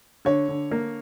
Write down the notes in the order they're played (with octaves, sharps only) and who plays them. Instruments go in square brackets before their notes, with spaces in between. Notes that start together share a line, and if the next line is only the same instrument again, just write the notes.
[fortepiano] D3 [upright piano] C#5
[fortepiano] D3
A#3